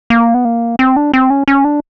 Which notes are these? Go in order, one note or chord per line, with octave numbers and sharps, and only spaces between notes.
A#3
B3
A#3
C4
D4
C4
C#4
C#4
D4